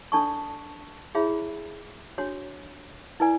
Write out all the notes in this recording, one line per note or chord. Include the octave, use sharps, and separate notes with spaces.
D4 A4 D5 A5 C#6
E4 G#4 C#5 E5 B5
D4 F#4 C#5
E4 B4 D5 G#5